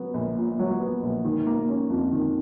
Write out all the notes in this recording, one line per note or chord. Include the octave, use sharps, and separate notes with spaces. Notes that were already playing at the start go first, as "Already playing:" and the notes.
Already playing: F#3 B3
A#1
A#2
F#3
B3
A#1
D#3
A#3
C#4
F2
D#3